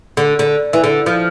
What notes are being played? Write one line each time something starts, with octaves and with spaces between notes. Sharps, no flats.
D3
D3
E3
D3
F3